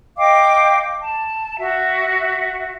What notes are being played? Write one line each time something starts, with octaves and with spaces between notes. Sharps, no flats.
D#5 F5 G5 D6
A5
F#4 E5